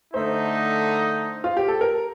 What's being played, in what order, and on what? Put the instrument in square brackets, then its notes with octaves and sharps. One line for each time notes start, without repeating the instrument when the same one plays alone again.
[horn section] D3 A3 D#4 [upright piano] C5
[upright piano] F4
G4
A4
A#4